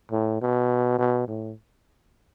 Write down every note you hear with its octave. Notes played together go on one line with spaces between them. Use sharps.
A2
B2
B2
A2